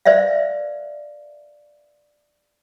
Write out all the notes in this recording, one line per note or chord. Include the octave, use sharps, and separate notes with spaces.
B4 C5 D5 E5 F5